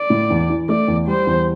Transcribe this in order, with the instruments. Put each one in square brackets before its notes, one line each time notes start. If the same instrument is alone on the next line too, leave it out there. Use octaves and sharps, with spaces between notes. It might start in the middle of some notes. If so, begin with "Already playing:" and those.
Already playing: [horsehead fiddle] D5
[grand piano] A2
E2
E3
[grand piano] A3 [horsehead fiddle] D5
[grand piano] E2
[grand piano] G3 [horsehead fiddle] C5
[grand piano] E2